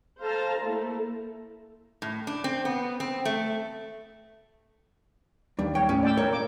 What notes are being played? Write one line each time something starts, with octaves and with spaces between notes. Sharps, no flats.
A4 C5 F5 A5 A#5
A3 A#3 E4 A4
A2
D4
C4
B3
C4
A3
D#2 G3 D4
C#5 G5
A2 C#4
D5 G5 E6
A#4 C#5
A#3 D6